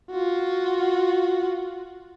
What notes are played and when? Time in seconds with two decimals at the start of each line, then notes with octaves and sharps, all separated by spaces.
0.10 F4 F#4